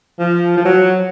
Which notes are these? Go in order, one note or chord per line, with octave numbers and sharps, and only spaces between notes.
F3
F3
F#3